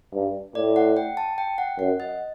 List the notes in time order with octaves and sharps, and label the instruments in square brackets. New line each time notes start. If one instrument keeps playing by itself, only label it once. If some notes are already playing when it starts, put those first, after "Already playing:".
[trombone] G2
[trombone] A2 [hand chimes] D5
[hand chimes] F#5
G5
A5
G5
F#5
[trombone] F#2 [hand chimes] F#5
[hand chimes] D#5